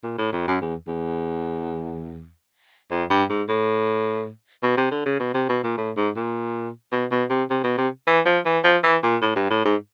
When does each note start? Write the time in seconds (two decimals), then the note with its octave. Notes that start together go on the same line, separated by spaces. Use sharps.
0.04 A#2
0.18 A2
0.33 F2
0.48 F#2
0.62 E2
0.87 E2
2.91 F2
3.10 G2
3.30 G#2
3.49 A2
4.63 B2
4.77 C3
4.91 D3
5.05 C#3
5.20 B2
5.34 C3
5.49 B2
5.64 A#2
5.78 A2
5.97 G#2
6.16 A#2
6.92 B2
7.11 B2
7.30 C3
7.50 C3
7.64 B2
7.78 C3
8.07 E3
8.26 F3
8.46 E3
8.64 F3
8.84 E3
9.03 A#2
9.22 A2
9.36 G2
9.51 A2
9.65 G#2